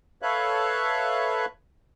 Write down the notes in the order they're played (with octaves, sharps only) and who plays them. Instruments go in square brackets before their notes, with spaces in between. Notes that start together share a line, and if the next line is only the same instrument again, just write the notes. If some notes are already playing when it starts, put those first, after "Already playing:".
[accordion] A4 B4 C#5 E5 F5 F#6